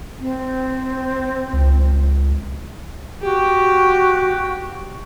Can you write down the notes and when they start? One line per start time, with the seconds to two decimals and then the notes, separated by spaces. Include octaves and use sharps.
0.19 C4
1.53 C#2
3.22 F#4 G4